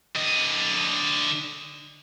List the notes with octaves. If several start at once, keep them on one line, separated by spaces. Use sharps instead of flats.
D3 D#5